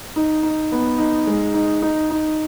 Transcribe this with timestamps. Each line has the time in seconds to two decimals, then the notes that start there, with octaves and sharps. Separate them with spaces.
0.16 D#4
0.43 D#4
0.72 B3
0.98 D#4
1.27 G#3
1.54 D#4
1.82 D#4
2.10 D#4